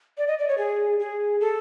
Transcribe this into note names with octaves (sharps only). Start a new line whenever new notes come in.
D5
D#5
D5
C#5
G#4
G#4
A4